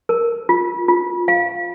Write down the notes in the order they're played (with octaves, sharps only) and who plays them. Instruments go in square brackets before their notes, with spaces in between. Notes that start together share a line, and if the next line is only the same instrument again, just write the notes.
[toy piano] A#4
F4
F4
F5